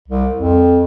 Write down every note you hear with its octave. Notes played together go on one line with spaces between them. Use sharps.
C2
F2